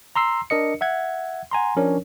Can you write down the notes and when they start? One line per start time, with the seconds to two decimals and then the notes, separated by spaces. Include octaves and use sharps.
0.16 A#5 C6 E6 C7
0.50 D4 A#4 D#5 C#7
0.81 E5 F#5 G#6
1.51 F#5 G#5 A#5 C6
1.77 F3 C#4 D4 A#4 C#5